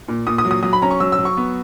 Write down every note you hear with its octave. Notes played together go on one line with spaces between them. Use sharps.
A#2
A#2 D#6
D#6
F#3
D#6
F#3 D#6
B5
C#4 A#5
C#6
F#3 E6
E6
F#3
C#6
B3